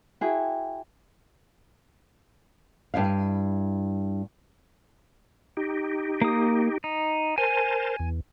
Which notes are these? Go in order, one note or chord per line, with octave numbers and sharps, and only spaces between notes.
E4 F#4 G#4 G5
G2 D#3 E4 F5
D#4 G4
A#3 D#6
D#4
A#4 C5 G#5 A5
E2